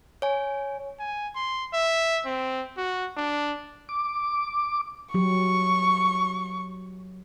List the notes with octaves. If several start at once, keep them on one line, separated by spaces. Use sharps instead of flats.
C#5 G#5
G#5
C6
E5
C4
F#4
D4
D6
F#3 G4 C#6